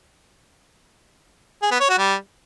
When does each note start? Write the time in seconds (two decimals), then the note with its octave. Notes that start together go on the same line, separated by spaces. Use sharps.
1.62 G#4
1.72 B3
1.81 C#5
1.90 F#4
1.99 G3